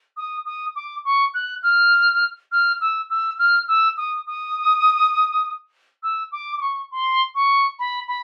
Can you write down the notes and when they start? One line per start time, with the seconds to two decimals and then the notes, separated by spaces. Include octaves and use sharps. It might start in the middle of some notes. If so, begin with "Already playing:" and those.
0.17 D#6
0.45 D#6
0.76 D6
1.05 C#6
1.34 F#6
1.63 F6
2.52 F6
2.81 E6
3.10 E6
3.39 F6
3.68 E6
3.97 D#6
4.27 D#6
6.03 E6
6.32 D6
6.57 D6
6.61 C#6
6.91 C6
7.35 C#6
7.79 B5
8.08 B5